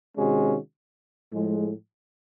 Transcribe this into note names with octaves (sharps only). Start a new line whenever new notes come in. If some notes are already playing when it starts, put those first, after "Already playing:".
C3 D#3 G#3 C#4 F#4
A2 F3 G#3